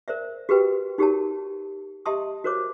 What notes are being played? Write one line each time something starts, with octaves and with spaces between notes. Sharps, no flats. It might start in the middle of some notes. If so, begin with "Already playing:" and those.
A#4 C5 D5 E5
F#4 G4 A#4 B4 G5
D#4 F#4 G4 A#4 C#5 A5
G4 D#5 E5 A5 C6 D#6
F#4 A#4 C5 C#5 D6